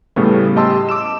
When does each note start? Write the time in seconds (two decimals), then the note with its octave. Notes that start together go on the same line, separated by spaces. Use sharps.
0.16 A2 C#3 G3 A3 B3
0.56 G4 D#5 A5 C6 E6
0.89 D6 E6 E7